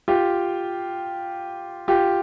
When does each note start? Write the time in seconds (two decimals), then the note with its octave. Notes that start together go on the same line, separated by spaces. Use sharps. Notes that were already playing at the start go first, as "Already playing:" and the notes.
0.08 F4 G4
1.88 F4 G4